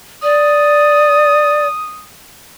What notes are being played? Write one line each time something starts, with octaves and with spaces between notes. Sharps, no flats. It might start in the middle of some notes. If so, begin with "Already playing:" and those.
D5 D#6